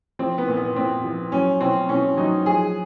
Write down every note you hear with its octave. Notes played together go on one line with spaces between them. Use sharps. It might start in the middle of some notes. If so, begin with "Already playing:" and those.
F3 C4
B3
A#2
B3
A#2 C4
F3
F#3 C#4
B2 C4
B2 C#4
F#3 D#4
F3 G#4